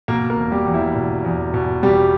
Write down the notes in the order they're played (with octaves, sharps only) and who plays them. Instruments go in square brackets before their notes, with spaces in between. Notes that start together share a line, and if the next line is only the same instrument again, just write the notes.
[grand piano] B2 A#3 A#4
A#3 A#4
E1
G3 G4
E2
E4
B2
E2
B2
E1 G3 G4